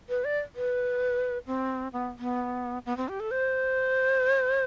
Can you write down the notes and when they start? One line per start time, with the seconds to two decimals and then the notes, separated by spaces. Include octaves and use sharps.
0.09 B4
0.25 D5
0.55 B4
1.47 C4
1.93 B3
2.19 B3
2.86 B3
2.97 C4
3.09 G4
3.20 A4
3.31 C5